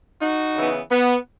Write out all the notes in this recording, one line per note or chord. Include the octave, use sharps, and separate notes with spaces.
D#4 F#4
C#3 E3 B3
B3